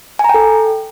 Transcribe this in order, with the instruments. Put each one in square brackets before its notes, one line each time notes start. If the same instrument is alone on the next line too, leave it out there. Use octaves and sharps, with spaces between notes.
[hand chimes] G#5
A#5
G5
A4